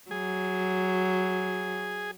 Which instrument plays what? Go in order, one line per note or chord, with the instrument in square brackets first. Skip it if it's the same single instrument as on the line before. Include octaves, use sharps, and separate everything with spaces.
[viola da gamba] F#3 [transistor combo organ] G#4